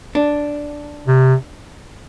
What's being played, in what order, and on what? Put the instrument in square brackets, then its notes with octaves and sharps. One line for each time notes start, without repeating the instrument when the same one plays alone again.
[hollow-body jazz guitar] D4
[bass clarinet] C3